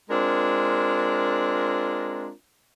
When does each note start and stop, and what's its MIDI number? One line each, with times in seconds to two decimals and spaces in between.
0.10 2.31 56
0.10 2.31 60
0.10 2.31 62
0.10 2.31 65
0.10 2.31 70